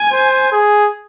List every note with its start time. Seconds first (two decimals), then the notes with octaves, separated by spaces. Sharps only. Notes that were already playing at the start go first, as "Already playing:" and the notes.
Already playing: G#5
0.12 C5
0.52 G#4